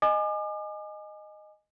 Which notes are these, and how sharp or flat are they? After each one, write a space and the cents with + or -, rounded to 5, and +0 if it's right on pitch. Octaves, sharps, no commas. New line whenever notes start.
D#5 -10 G#5 +0 D6 +40